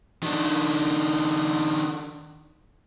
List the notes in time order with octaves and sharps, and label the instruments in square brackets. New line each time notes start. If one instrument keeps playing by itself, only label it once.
[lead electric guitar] D#3 D4